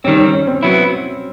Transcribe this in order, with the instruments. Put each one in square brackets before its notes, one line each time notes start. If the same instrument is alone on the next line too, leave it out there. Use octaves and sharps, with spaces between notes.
[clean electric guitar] D#3 G3 C4 [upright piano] C#4
[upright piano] C#4
C#4
C4
[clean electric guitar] F#3 B3 E4